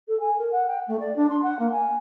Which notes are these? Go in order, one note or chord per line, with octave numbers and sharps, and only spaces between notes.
A4
G#5
A#4
F#5
G5
A3
D5
D4
C6
F#5
A#3
G#5